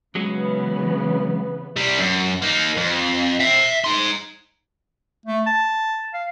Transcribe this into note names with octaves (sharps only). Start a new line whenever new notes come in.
C#3 E3 F#3 G#3 B3 C#4
C3 G3
F#2
A#3 D#4
F2
E5 G5
D#4 C6
A3
A5
F5